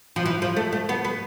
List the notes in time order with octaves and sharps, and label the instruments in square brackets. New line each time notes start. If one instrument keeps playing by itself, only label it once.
[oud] F3
E3
F3
A3
A3
B3
B3